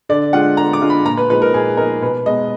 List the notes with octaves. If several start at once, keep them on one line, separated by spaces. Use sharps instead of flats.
D3 D5
G#3 D4 F4 F#5
D3 A#5
D6
G#3 D4 F4
B5
A#2 A#5
B4
F3 G#3 D#4 B4
A#4
A#2 G#4
F3 G#3 D#4 A#4
B2 B4
G#3 B3 D#5